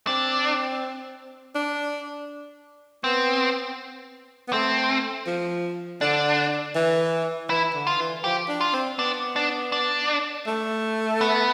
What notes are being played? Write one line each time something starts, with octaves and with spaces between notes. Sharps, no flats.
C4 D4
D4
B3 C4
B3
A3 C4
F3
D3 D4
E3
E3 E4
D3
F4
E3
F3 G4
D4
F4
C4
B3 D4
D4
D4
A3
B3